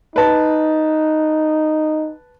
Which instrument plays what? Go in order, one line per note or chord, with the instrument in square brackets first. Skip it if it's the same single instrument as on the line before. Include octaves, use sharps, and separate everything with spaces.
[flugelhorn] D#4 [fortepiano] B4 A5